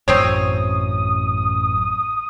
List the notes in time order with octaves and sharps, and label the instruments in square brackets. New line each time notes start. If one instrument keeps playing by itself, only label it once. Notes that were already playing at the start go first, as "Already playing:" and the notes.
[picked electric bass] A1 F#2 [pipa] C4 C5 C#5 [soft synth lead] D#6